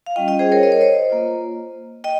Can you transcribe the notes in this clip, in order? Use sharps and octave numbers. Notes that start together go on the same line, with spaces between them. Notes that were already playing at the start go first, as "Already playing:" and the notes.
F5
G3 C#4 F4 D#5 G5
D#5 G5
G#4 C5
A#4 C#5
D#5
C#5
C5 D#5
A#3 F4
D#5 G5